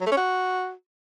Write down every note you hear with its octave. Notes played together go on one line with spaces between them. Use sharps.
F#3
A3
C#4
F#4